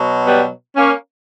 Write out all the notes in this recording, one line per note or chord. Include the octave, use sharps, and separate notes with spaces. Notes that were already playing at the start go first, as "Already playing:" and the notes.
Already playing: B2 F#3
G3 B3
A#3 C#4